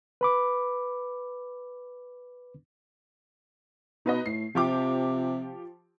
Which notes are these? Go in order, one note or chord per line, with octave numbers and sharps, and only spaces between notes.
B4 B5 D6
B2 D#4 B4 D#5
A2 C7
C3 F3 G4 D6